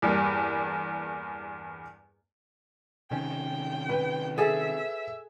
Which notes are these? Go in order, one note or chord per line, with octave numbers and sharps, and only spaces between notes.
E2 G2 G3 A#3
C3 D#3 C#4 G5
B4
G#4 A4 E5